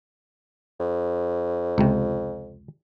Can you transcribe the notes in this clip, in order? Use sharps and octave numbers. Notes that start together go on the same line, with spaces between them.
F2
C#2 C3